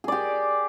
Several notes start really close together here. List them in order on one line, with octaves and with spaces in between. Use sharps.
G#4 D5 G4